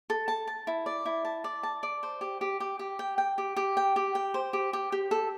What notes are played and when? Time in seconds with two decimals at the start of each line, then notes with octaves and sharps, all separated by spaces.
0.10 A4
0.28 A5
0.47 A5
0.67 E4
0.86 D5
1.06 E4
1.25 A5
1.44 D5
1.63 A5
1.83 D5
2.03 C5
2.21 G4
2.41 G4
2.60 G4
2.79 G4
2.99 G5
3.18 G5
3.38 G4
3.56 G4
3.77 G5
3.96 G4
4.15 G5
4.34 C5
4.53 G4
4.73 G4
4.92 G4
5.11 A4